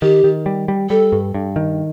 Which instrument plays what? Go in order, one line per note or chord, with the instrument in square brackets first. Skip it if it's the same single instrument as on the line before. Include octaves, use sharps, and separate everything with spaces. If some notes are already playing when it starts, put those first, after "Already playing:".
[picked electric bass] D#3 [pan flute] G4
[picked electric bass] D#3
G3
G3
[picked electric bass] G3 [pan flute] A4
[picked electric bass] G2
G2
D#3